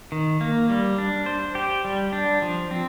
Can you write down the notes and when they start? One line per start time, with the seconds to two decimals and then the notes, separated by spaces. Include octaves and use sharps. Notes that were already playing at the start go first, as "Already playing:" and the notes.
0.12 D#3
0.41 A#3
0.70 G3
0.98 D4
1.26 C5
1.55 G4
1.85 G3
2.12 D4
2.42 F3
2.71 C4